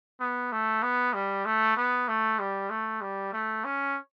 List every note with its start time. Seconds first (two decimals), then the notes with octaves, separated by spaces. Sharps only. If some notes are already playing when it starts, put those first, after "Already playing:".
0.20 B3
0.52 A3
0.83 B3
1.14 G3
1.46 A3
1.77 B3
2.08 A3
2.39 G3
2.70 A3
3.01 G3
3.33 A3
3.64 C#4